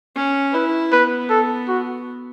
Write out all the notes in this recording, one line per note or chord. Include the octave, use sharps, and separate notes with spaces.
C#4
E4 B4
B3 B4
A4
F#4